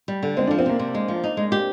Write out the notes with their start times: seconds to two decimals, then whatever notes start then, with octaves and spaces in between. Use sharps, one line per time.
0.08 G3
0.23 D3
0.37 G#3 C4
0.47 D4
0.51 F3
0.59 C4
0.66 C3 A#3
0.79 C3
0.95 G#3
1.08 F3
1.24 D#4
1.37 G#3
1.52 G4